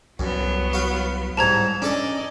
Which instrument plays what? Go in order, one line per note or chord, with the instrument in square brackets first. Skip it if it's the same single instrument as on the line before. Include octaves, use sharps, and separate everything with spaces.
[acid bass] C2 [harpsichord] F#2 [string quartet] F#3 B3
[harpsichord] F#4 F5
[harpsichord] C2 G#2 [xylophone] A5 A#5 G#6
[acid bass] C#4 [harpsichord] D4 A4 [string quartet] D5 D#5